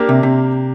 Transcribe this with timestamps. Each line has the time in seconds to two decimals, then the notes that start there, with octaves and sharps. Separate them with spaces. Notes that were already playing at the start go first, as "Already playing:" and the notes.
Already playing: A#3 D4 G4 A#4
0.09 C3
0.23 C3